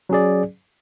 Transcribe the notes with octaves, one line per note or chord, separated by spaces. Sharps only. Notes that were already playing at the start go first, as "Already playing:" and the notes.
F#3 C#4 G#4 D5